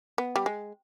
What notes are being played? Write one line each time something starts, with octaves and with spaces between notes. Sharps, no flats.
B3
G3
G#3